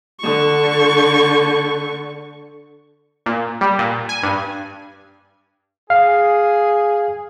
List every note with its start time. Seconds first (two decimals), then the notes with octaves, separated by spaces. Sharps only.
0.21 D3 C#6
3.26 A#2
3.61 G3
3.79 A#2
4.09 G#5
4.23 G2
5.90 G#4 F5